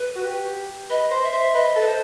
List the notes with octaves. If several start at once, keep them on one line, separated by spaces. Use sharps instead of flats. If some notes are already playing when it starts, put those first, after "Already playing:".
Already playing: B4
F#4
G4
B4 D#5
C5
E5
C5
B4 D#5
A4
B4
C5